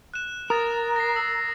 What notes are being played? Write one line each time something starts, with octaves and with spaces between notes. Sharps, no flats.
F#6 E7
A#4 D#6 A6 A#6
A#6 C7
E6